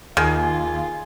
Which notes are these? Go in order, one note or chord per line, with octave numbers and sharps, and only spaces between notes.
D#2 D#3 F4 G#4